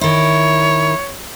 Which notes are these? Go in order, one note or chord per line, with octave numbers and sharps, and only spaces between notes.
D#3 E4 C#5